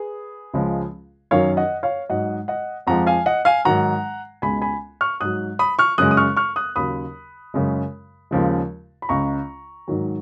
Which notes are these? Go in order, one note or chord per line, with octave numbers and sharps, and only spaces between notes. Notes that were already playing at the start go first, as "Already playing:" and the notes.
Already playing: G#4 B4
C#2 C#3 F3 G#3
F#2 D#3 F#3 C#5 F5
D#5 F#5
C#5 F5
G#2 F#3 D#5 F#5
D#5 F#5
F2 F3 G#3 F#5 A#5
F5 G#5
D#5 F#5
F5 G#5
G#2 D#3 F#3 F#5 A#5
C#2 B2 G#3 G#5 B5
G#5 B5
C#6 F6
G#2 F#3 D#6 F#6
B5 D#6
C#6 F6
F#2 C#3 G#3 D#6 F#6
D#6
C#6 F6
C#6 F6
D#6 F#6
D#2 C#3 F#3 B5 D#6
F#2 C#3 G#3
D#2 C#3 F3 G#3
B5
C#2 C#3 G#3 A#5 C#6
G#2 D#3 F#3